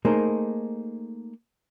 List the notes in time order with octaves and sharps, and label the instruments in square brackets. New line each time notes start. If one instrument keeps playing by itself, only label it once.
[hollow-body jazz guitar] A3 A#3 D#4 G#4 A#4 C5